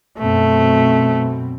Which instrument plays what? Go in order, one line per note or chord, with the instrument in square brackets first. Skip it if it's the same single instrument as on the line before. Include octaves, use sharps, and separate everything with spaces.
[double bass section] F#2 B2 C4 [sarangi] A3